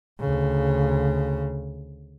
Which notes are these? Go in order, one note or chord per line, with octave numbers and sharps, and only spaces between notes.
D2 C#3